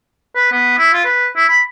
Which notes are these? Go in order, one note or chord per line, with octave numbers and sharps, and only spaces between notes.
B4
B3
E4
F4
B4
E4
B5